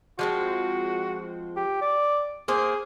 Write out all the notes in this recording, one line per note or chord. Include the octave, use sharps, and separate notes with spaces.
F3 G#3 C4 F#4
G4
D5
A#3 G#4 C5